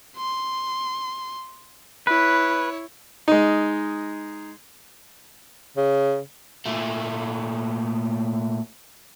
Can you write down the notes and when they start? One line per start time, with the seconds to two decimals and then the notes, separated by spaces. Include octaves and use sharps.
0.17 C6
2.07 E4 B4 C#5
3.28 G#3 D#4
5.77 C#3
6.66 A#2 A3